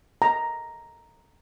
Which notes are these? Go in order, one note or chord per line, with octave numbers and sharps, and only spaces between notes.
A#5